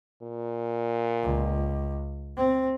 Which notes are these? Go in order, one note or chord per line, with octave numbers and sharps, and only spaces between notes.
A#2
C#2
C4